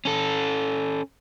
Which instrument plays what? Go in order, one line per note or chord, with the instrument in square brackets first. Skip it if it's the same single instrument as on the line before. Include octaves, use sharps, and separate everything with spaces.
[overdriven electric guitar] C#4 A4